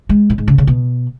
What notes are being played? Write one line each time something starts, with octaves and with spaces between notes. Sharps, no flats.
G#3
A2
G#2
C#3
C#3
B2